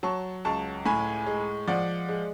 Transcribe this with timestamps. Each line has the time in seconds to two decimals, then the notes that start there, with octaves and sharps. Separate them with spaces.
0.03 F#3 A5 C#6
0.45 C#2 A5 C#6
0.86 A2 G#5 B5
1.27 G#3
1.68 F3 D5 F#5
2.09 G#3